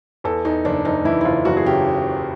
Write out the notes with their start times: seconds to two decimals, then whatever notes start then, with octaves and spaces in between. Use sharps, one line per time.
0.24 E2 A4
0.45 E2 D#4
0.65 F#1 D4
0.85 F#1 D#4
1.05 E3 E4
1.21 E4
1.25 F#1 F4
1.45 F#1 F#4
1.57 G#4
1.65 C#3 G4